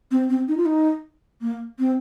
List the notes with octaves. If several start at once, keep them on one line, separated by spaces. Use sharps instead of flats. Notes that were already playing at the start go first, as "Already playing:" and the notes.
C4
C4
D#4
F4
D#4
A#3
C4